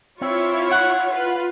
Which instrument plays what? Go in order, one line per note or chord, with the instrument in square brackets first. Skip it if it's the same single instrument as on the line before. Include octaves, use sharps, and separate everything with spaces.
[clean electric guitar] C4 [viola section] E4 F4 C#5
[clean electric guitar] F#5
[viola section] F4 B4